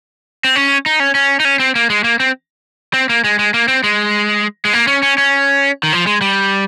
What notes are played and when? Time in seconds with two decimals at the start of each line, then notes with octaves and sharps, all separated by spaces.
0.44 C4
0.56 C#4
0.86 D#4
1.00 C#4
1.15 C#4
1.40 D#4
1.45 C#4
1.60 C4
1.75 A#3
1.90 G#3
2.04 A#3
2.20 C4
2.94 C4
3.09 A#3
3.24 G#3
3.39 G#3
3.54 A#3
3.68 C4
3.84 G#3
4.65 G#3
4.73 A#3
4.87 C#4
5.03 C#4
5.18 C#4
5.83 D#3
5.93 F3
6.07 G#3
6.21 G3